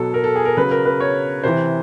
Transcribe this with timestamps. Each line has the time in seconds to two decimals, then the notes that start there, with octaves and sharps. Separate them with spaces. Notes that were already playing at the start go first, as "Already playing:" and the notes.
Already playing: B2 F#3 A4
0.14 A#4
0.24 A4
0.36 G#4
0.45 A#4
0.57 C#3 F#3 B4
0.71 A#4
0.85 B4
1.00 C#5
1.44 C3 E3 C5